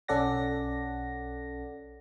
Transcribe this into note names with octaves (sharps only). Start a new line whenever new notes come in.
B1 C#4 A4 D5 F#5 A#6